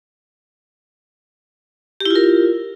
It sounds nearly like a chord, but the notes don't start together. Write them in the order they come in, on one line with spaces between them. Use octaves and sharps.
G4 E4 F4 A#4